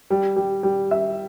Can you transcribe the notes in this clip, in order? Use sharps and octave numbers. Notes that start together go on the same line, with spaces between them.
G3
G3
G3
E5